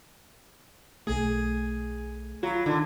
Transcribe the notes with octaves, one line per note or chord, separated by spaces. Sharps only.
B1 A3 G#4
F#3 F4 B5
D3 D#3